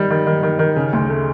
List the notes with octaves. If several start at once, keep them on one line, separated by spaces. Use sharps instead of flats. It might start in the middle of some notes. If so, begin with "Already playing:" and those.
Already playing: D#3 G3
D#3
D#3
D#3
D#3
C#3
D2
A3